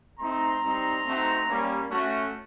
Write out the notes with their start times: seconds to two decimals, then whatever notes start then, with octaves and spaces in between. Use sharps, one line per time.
0.19 A3 C4 D#4 A#5 C6
0.62 G3 C4 D#4
1.05 A3 C4 D#4 F#4
1.48 G3 A#3 C#4
1.91 A3 C#4 F#4